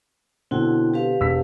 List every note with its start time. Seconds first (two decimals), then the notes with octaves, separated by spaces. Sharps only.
0.51 B2 D3 C4 E4 F#4 G5
0.94 G4 B4 F5
1.20 E1 E6 B6